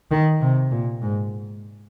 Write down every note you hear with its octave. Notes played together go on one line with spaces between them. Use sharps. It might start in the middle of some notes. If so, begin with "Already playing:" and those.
D#3
C3
A#2
G#2